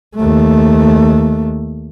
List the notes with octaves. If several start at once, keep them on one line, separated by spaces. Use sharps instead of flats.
D#2 A3